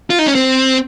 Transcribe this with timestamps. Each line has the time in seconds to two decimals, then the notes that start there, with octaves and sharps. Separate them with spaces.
0.10 F4
0.19 D#4
0.27 C#4
0.35 C4